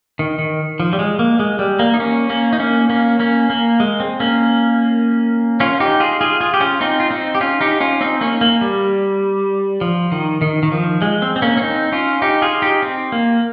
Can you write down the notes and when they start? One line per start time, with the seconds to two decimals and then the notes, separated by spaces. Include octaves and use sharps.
0.19 D#3
0.39 D#3
0.80 F3
0.93 G3
0.99 G#3
1.19 A#3
1.39 G#3
1.59 G3
1.79 A#3
1.94 D#4
1.99 A#3 C#4
2.29 A#3 C#4
2.53 D#4
2.59 A#3 C#4
2.90 A#3 C#4
3.20 A#3 C#4
3.50 A#3
3.80 G#3
4.00 C4
4.20 A#3 C#4
5.60 C#4 F4
5.80 D#4 G4
6.00 F4 G#4
6.21 F4 G#4
6.41 F4 G#4
6.54 G4
6.60 C#4 F4
6.81 C4 D#4
7.00 F4
7.11 C4 D#4
7.35 G4
7.41 C#4 F4
7.61 D#4 G4
7.80 C#4 F4
8.01 C4 D#4
8.21 A#3 C#4
8.41 A#3
8.61 G3
9.81 F3
10.12 D#3
10.42 D#3
10.63 D#3
10.72 F3
11.02 G#3
11.22 C4
11.36 C4
11.42 A#3 C#4
11.57 C#4
11.62 C4 D#4
11.92 C#4 F4
12.22 D#4 G4
12.42 F4 G#4
12.62 D#4 G4
12.82 C4
13.12 A#3